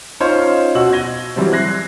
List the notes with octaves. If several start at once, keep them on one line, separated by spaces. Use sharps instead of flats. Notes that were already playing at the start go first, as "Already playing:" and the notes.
C#4 D#4 F4 C5 C#5
B2 F#4 D#5 E6 F#7
G#6 A#6 D#7 G7
E3 F#3 G3 C4
F#6 G#6 A#6 C7